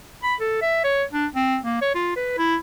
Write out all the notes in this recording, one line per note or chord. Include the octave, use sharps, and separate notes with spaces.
B5
A4
E5
C#5
D4
C4
A#3
C#5
F4
B4
E4